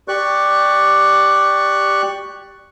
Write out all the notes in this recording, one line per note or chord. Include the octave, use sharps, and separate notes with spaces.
G4 D5 C#6 F#6